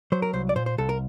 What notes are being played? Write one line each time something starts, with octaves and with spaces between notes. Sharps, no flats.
F#3 C5
A#4
C2 C5
D5
A#2 C5
C5
C2 A4
A#4